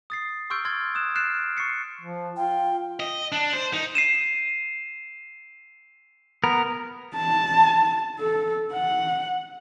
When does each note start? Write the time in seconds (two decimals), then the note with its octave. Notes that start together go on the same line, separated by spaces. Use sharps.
0.10 D#6 A6 C7
0.50 C6 C#6 E6 F6 G6 D7
0.65 C6 E6 F6 G#6 A6
0.95 D#6 F#6 E7
1.15 F6 F#6 A6 C7 D7 E7
1.57 C#6 A6 C7 C#7
2.02 F3
2.36 F4 G5
3.00 D#5
3.32 D4
3.53 C5
3.73 D#4
3.95 C7 D#7 E7
6.44 B3 A#4
7.15 A5
8.19 A4
8.74 F#5